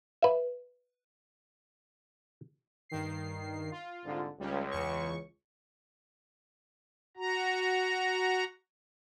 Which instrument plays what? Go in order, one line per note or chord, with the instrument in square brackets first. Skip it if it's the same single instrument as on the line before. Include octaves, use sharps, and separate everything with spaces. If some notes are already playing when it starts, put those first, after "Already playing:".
[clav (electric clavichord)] B4 E5
[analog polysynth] G2 D#3 C7
F4
[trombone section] C2 G#2 D3
[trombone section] C#2 [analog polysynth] G3 C#4
[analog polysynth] E2 C#6
[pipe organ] F#4 A#5